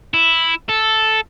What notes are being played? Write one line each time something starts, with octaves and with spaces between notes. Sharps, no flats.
E4
A4